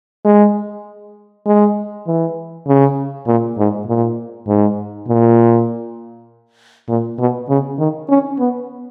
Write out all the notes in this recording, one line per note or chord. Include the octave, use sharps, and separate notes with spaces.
G#3
G#3
E3
C#3
A#2
G#2
A#2
G#2
A#2
A#2
B2
C#3
D#3
C#4
B3